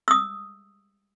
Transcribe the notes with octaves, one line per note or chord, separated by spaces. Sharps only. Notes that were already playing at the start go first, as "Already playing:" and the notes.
D#6 E6